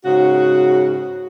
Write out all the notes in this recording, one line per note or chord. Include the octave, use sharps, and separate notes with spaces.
G#2 C#3 F#4